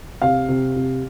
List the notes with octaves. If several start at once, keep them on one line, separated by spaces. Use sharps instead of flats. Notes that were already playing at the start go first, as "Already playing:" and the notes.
C3 F5
C3
C3